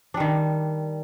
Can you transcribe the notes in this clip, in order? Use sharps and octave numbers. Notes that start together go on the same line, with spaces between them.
D#3 G3 D4